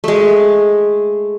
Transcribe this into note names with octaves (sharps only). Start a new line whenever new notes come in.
G#3 A3